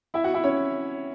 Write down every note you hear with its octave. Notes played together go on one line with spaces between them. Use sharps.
E4 E5
F#4 F#5
E4 E5
C#4 C#5